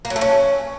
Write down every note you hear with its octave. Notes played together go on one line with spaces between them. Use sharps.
A#3
F#3
A3
C#4